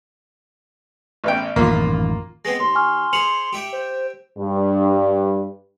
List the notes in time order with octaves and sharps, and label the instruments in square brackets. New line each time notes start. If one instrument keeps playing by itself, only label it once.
[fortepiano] A1 B3 G5
[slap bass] A1 F#2 D#3 [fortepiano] A#3 F4
[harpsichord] G#3 B3 C4 [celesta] A#6
[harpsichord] D#2 [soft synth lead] C6
[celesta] G#5 C#6 F6
[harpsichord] G#4 C5 [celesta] C#7 F7 F#7
[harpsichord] G4 E5 G5
[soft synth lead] C5
[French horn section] G2